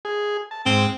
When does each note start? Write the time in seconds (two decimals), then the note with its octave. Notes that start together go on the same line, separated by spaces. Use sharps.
0.05 G#4
0.51 A5
0.66 G#2 C4